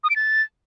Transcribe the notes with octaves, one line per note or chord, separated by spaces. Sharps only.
D#6
D7
A6